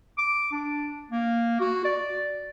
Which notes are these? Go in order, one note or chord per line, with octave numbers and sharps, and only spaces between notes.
D6
D4
A#3
F#4
D5